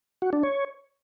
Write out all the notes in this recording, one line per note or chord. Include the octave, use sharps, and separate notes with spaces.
F#4
D4
C#5